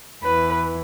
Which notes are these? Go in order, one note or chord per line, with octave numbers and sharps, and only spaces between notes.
E2 E3 B4